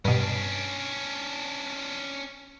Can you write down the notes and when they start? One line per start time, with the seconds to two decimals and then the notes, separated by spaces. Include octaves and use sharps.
0.05 G2 B2 C#4 D4